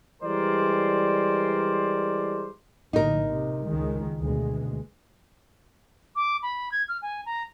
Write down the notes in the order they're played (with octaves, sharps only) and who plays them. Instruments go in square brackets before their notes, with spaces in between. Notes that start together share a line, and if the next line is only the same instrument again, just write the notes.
[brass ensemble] E3 G3 G#3 A#4 C5 D5
[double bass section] A#1 A2 D3 [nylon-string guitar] D#4 A#4
[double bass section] C3
C#2 D#3 G#3
D2 B2 G#3
[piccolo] D6
B5
G#6
F6
G#5
A#5